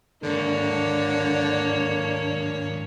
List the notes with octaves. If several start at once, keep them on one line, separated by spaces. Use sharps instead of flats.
D#2 G#2 D3 A#3 D4 C#5